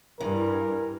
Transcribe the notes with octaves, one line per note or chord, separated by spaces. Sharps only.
G2 E3 A#4